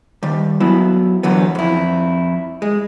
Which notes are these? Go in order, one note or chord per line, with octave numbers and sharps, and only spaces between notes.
D#3 G3
F#3 B3 E4
D3 E3 F#3 B3
F2 E4
G#3